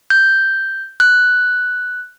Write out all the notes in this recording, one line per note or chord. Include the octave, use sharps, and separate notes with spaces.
G6
F#6